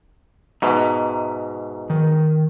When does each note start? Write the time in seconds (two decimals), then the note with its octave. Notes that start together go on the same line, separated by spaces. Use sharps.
0.62 G#2 B2 E5 A#5
1.90 D#3